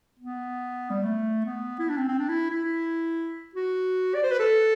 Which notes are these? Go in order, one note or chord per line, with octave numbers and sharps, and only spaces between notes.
B3
G3
A3
B3
E4
D4
C4
C4
D4
E4
E4
F#4
D5
C5
B4
A4